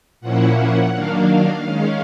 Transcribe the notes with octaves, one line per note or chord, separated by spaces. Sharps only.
A#2 F3 A#3 C#4 E4 F#5
F#5
D#3 F#3 A#3 D4 F5
D#3 G#3 C#4